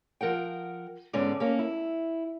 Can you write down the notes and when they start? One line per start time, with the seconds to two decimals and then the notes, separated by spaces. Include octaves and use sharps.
0.21 F3 A#4 F#5 G5
1.13 G#2 D3 B3 C#4 D5
1.40 A#3 C#4
1.59 E4